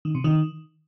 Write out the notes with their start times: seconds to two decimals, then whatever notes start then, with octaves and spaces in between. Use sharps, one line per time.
0.05 D#3
0.15 C3
0.24 D#3